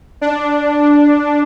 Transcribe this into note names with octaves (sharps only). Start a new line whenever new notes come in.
D4